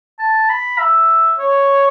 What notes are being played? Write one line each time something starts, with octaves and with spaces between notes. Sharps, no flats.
A5
B5
E5
C#5